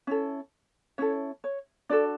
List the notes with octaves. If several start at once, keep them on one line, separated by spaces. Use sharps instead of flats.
C#4 E4 A4
C#4 E4 A4 C#5
C#5
D4 F#4 A4 D5